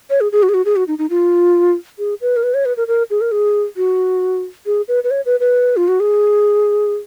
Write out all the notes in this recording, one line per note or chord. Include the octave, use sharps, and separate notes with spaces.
C#5
G#4
G#4
F#4
G#4
F#4
G#4
F#4
D#4
D#4
F4
G#4
B4
A#4
B4
C#5
B4
A#4
A#4
G#4
A#4
G#4
F#4
G#4
B4
B4
C#5
B4
B4
F4
F#4
G#4